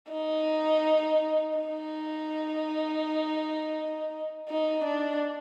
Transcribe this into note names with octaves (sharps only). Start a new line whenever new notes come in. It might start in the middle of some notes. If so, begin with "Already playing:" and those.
D#4
D#4
D#4
D4